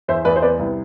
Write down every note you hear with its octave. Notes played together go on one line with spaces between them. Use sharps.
E2 C5 E5
E2 B4 D5
C5
B3 B4 D5
C2